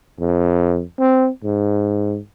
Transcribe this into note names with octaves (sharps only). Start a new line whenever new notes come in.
F2
C4
G#2